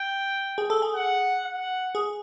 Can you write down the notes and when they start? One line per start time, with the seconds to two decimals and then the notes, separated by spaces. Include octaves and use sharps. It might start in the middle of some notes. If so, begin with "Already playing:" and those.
Already playing: G5
0.58 G#4
0.70 A4
0.82 G#4
0.95 F#5
1.45 F#5
1.95 G#4